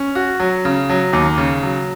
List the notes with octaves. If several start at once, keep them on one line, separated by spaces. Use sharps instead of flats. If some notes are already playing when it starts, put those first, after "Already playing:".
Already playing: C#4
F#4
F#3
C#3
F#3
D#2
C#3
F#3